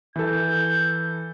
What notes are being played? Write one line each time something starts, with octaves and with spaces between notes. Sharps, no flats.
E3 A4 G6